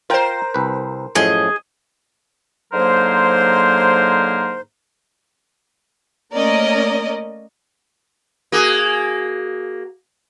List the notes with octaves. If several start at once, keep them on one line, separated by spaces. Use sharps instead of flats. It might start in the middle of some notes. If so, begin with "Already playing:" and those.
F4 A#4 C5 G5
C2 B4
F#2 A2 F3 G#4 D#5
G#2 D3 F#3 A#3 A#4 C5
A3 A#3 C#4 A#4 D5 D#5
A#3 F#4 G#4